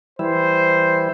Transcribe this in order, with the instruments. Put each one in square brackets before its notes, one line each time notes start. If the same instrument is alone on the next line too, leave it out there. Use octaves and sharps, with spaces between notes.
[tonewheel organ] E3 G3 E4 [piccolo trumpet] C5